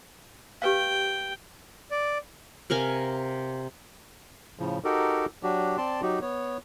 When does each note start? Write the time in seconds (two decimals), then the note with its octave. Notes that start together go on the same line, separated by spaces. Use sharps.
0.62 G4 B4 F5 G5
1.91 D5
2.70 C3 A#4 F5 G#5
4.59 A2 C#3 F3
4.84 D#4 F#4 G4 A4 A#4
5.43 F#3 D4 F#4 G4
5.77 C4 D5 A5 C6
6.02 F#3 D#4 F#4 G4
6.22 B3 C#5